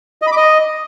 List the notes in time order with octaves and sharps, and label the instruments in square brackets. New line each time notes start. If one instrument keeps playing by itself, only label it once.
[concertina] D#5
B5
D6
D#5